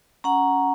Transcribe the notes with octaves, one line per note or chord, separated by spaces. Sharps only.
C#4 F#5 A#5